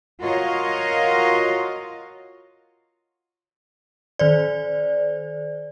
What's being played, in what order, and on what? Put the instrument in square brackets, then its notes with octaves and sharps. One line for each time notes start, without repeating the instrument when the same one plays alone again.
[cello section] F4 F#4 A#4 C#5 D#5 F5
[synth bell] D#3 C5 D5